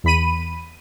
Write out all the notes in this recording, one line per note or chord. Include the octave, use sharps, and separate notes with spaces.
E2 B5 D#7